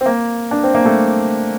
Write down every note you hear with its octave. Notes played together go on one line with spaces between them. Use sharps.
C4
A#3
D4
C4
A#3
A3